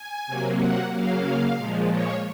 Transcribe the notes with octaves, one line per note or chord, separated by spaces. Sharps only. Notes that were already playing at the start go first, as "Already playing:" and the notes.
Already playing: G#5
C3 F#3 A#3
F#5
C#3 F#3 A#3 F5
A#2 F3 G#3
C#5